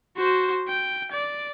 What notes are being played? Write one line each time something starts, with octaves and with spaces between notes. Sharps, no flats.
F#4 C5
G5
D5